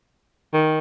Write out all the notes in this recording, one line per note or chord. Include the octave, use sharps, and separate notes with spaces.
D#3